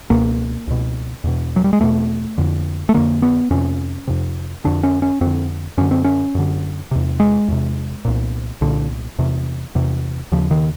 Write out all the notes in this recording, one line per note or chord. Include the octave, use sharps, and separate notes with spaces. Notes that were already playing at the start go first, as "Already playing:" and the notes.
C#2 B2 A#3
C#2 B2
E2 B2
F#3
G3
G#3
E2 B2 A3
F2 D3
A3
F2 D3 A#3
B3
F2 C3 C#4
F2 C3
F2 D3 D4
C#4
C#4
F2 D3 C4
F#2 D3 C#4
C4
C#4
F#2 D3
E2 C3
G#3
E2 C3
C2 A#2
C2 A#2 D3
E2 C3
E2 C3
D#2 C#3 F3
D#3